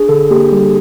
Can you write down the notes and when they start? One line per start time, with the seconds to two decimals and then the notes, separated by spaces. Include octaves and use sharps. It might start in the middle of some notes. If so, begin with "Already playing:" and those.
Already playing: D4 G#4
0.08 D3 A4
0.30 A#3 G4
0.52 G3